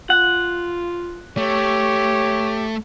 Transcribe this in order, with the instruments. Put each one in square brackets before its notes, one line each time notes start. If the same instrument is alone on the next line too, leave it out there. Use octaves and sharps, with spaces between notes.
[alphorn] F4 [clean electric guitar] F#5
[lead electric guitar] A3 [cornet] G4 [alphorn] C#5